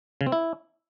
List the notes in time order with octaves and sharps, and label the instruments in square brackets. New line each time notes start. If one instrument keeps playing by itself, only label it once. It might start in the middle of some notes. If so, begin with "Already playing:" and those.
[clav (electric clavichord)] C#3
C4
E4